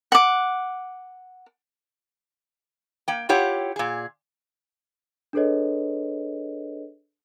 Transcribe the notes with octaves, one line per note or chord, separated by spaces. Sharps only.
F#5 D6
A#3 G5
E4 F4 G4 C#5 F#5 G5
A#2 G#4
D4 G#4 A4 B4 C#5 D#5